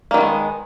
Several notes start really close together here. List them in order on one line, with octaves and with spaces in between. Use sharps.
A#3 D#3 B3 G#3